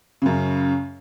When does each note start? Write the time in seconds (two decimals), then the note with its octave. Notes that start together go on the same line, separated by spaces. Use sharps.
0.22 F#2 C#3